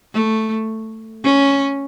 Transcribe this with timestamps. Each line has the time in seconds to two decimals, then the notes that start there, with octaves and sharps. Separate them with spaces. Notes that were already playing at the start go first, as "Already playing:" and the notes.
0.13 A3
1.23 C#4